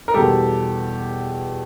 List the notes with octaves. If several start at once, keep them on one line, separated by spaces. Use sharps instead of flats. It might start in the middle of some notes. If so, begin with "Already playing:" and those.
A#4
E2 B2 G3 G4 A4